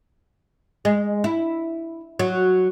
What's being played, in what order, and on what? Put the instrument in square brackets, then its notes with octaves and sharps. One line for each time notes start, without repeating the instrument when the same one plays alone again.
[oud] G#3
E4
F#3